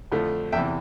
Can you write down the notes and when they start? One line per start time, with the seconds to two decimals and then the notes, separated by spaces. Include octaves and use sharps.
0.12 F2 D3 F3 A3
0.52 E2 C3 E3 E5 G5